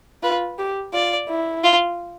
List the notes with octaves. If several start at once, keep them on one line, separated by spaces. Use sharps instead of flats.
F4 B4
G4
F4 D5
E4
F4